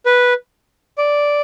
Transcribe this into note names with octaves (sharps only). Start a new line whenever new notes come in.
B4
D5